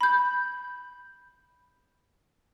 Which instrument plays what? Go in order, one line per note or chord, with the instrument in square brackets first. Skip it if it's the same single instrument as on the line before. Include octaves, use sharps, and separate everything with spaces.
[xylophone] B5 G6